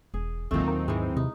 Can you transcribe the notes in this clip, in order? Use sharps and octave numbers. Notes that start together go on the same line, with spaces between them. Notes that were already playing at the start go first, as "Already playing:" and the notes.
E1 G#4
A1 D#2 A#2 D#3 F#3 A3 C4 D#4
A#3
G#2 E3 G#3
C3 D#4